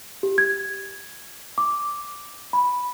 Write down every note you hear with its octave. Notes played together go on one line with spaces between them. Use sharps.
G4
G#6
D6
B5